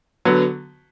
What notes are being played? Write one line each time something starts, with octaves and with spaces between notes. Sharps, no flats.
D3 F#3 B3